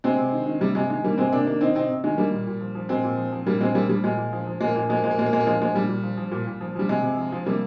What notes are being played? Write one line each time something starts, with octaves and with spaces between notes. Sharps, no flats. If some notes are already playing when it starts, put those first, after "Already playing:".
C3 G#3 C4
C3
D#3
D#3
C3 G3
C3 G#3
D#3 G#3
D#3 G3 A#3
C3 G#3 C4
C3 A#3 D4
D#3 A#3 D4
D#3 C4 D#4
C3 C4 D#4
C3
D#3 G#3
D#3 G3 A#3
A#2
A#2
F3
F3
A#2 G#3 C4
A#2
F3
F3
A#2 G3 A#3
A#2 G#3 C4
F3 G3 A#3
F3 G3
A#2 G#3
A#2
F3
F3
A#2 G#3
A#3
A#2 G#3
A#3
F3 G#3
A#3
F3 G#3
A#3
A#2 G#3
A#3
A#2 G#3
A#3
F3 G#3
A#3
F3 G#3
A#2 G3
A#2
F3
F3
A#2
A#2
F3
F3 G3
C3 G#3
C3
F3
F3
C3 G3 A#3